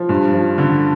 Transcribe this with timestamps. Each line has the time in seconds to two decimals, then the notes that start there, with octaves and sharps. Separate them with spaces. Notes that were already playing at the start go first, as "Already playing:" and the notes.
Already playing: F3
0.09 G2
0.34 F3
0.58 D3